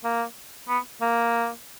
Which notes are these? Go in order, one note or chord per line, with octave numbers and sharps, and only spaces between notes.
A#3
B3
A#3